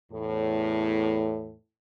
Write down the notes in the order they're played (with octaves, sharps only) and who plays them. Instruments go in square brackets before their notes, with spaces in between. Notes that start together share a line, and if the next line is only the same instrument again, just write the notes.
[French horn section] E2 A2